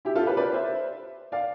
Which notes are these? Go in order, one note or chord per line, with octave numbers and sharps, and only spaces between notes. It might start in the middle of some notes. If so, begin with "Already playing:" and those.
E4 G4
F4 A4
G4 B4
B4 D5
C5 E5
D5 F5